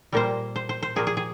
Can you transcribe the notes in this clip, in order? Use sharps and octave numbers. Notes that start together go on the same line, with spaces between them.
A#2 G3 A#3 C5
C5
C5
C5
A#2 F3 A#3 G#4
G#4
G#4